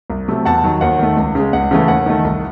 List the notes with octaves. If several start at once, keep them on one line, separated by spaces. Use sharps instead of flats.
C2
C3 F#3 A3
E2 F#5 A5
D#3 F#3
D#2 F#5
D#3 A3
C#2
C#3 G#3
C#2 F#5
C#3 E3 A3
D#2 F#5
D#3 A3
C2